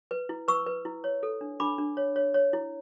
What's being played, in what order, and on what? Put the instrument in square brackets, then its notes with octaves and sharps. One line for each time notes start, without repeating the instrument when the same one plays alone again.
[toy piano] B4
E4
B4 C#6 E6
B4
E4
C#5
A4
D4
D4 B5 D6
D4
C#5
C#5
C#5
E4